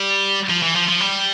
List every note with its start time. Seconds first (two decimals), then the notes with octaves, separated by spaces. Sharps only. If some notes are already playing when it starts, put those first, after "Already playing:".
Already playing: G3
0.49 F3
0.62 E3
0.75 F3
0.88 F3
1.00 G3